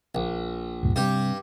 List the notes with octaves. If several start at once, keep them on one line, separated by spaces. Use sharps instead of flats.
A#1
C#2 G2 A#2
G2 C3 G3 G4